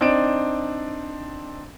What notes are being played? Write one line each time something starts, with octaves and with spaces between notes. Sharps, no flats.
C4 D4 D#4 D5 D7 E7